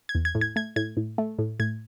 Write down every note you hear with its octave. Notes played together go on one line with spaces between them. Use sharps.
G#6
E2
G#6
A2
G#6
A3 G#6
A2 G#6
A2
A3
A2
A2 G#6